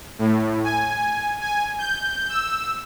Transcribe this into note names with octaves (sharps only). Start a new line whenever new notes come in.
A2
G#5
G#5
G6
E6